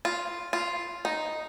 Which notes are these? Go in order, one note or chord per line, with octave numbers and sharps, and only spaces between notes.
F4
F4
D#4